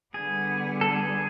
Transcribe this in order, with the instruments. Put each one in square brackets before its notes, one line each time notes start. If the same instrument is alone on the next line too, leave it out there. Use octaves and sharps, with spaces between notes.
[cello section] D3 G3 B3 [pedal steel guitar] G#4
[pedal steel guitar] A4
G#4